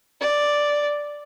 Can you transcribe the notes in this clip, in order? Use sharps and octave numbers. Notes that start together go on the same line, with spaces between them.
D5